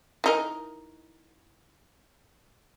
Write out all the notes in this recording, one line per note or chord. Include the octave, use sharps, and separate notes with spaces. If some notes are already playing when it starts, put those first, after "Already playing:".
E3 D#4 A#4